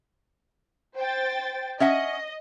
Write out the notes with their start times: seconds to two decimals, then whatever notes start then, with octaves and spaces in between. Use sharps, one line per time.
0.97 C5 G5 A6
1.80 C#4 D#5 E5 F#5